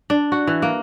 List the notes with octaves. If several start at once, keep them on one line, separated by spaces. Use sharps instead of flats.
D4
F#4
E3
A#3